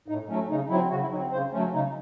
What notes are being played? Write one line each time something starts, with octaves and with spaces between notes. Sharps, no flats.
A2 D#4
F#3 A3 C#4
C#3 D#4
F#3 C4 E4
C#3 F#4
E4
F#3 C4 D#4
C#3 C5
F#3 A3 C#4
C#3 D#4